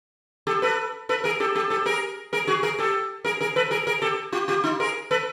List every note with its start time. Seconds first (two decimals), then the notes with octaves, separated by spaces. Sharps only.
0.47 G4 A4
0.62 A4 B4
1.09 A4 B4
1.24 G#4 A#4
1.40 G4 A4
1.55 G4 A4
1.70 G4 A4
1.86 G#4 A#4
2.33 G#4 A#4
2.47 F#4 G#4
2.63 G#4 A#4
2.78 G4 A4
3.24 G#4 A#4
3.40 G#4 A#4
3.56 A4 B4
3.71 G#4 A#4
3.87 G#4 A#4
4.02 G4 A4
4.32 F4 G4
4.48 F4 G4
4.64 D#4 F4
4.80 G#4 A#4
5.11 A4 B4